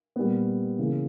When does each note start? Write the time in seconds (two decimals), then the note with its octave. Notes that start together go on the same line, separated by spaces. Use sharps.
0.16 A#2 G3 B3
0.79 C#3 E3 A#3